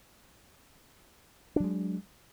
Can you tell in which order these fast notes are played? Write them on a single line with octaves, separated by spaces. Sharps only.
D4 F#3 G#3